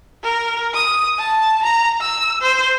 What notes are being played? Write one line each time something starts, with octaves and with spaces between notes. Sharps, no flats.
A#4
D#6
A5
A#5
E6
C5